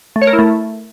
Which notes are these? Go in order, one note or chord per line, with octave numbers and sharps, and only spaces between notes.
A3
C#5
A#4
E4
A3